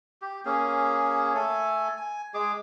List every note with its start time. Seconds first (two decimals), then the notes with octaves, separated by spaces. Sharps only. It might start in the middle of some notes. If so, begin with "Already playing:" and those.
0.22 G4
0.45 A#3 C#4 G#4
1.35 A3 A4 G#5
1.97 G#5
2.34 G#3 G#4 D6